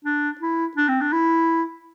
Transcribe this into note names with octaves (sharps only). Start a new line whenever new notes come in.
D4
E4
D4
C4
D4
E4